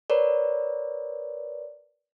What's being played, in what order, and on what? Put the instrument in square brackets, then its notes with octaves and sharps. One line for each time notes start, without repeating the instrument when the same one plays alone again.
[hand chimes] A#4 B4 C#5 D5